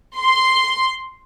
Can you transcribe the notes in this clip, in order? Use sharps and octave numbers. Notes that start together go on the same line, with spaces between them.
C6